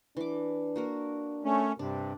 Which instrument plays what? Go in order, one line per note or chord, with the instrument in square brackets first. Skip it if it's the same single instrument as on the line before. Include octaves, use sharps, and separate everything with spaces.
[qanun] E3 D6 [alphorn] D4
[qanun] A#3 F#4 A#4
[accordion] A3 C#4
[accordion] G2 C3 [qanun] D4